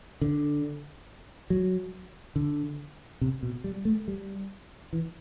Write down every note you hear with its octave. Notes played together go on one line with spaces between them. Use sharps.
D3
F#3
D3
C3
B2
G3
A3
G3
E3